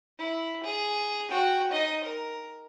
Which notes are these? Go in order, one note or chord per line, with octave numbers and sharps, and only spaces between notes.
E4
G#4
F#4 G5
D#4 D#5
A#4